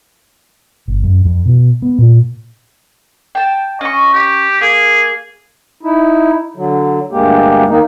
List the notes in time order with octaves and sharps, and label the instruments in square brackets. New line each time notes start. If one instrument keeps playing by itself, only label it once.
[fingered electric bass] G1
F#2
F2
B2
B3
A#2
[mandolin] G5 A5
[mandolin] C#4 C#6 [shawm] D#5
[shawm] G4
[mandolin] A#3 [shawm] G#4
[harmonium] D#4 E4
D3 F#3
D2 G2 G#3 A#3 G4
D#3 A#3 D#4